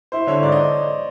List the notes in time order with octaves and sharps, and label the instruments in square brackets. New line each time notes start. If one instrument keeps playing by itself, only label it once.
[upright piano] E4 [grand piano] C5
[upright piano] D3 [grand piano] C#5
[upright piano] G#2 [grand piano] D5
[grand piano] D#5